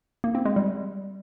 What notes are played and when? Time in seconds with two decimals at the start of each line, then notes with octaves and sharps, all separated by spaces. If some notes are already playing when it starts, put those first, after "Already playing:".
0.24 A#3
0.35 C4
0.46 G#3
0.56 G3